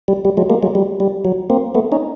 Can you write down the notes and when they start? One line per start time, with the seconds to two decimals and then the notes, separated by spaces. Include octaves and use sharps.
0.08 G3
0.25 G3
0.37 F#3 G#3
0.50 G#3 A#3
0.63 F#3 G#3
0.75 G3
1.00 G3
1.25 F#3
1.50 A#3 C4
1.75 A3 B3
1.92 C#4 D#4